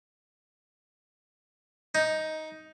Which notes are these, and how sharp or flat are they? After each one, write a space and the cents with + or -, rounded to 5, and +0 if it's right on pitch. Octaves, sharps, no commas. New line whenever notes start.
D#4 +10